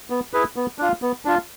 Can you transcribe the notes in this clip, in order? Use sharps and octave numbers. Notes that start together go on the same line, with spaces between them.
B3
E4 G#4 B4
B3
D4 F4
B3
D4 F4